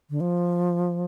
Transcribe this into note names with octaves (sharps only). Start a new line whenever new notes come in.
D3
F3